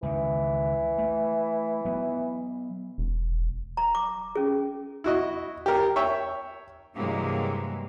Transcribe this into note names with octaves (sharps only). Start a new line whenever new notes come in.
C#2 D#3 E3
A3
F#3 B3
E1
A#5
D6
C#4 G#4
E4 F#4 D#5
G4 A#4
C#5 E5 G5
G2 C3 E3 F#3 G#3 A#3